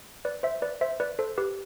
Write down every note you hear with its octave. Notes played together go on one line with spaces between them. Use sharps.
B4 D5
C5 E5
B4 D5
C5 E5
B4 D5
A4 C5
G4 B4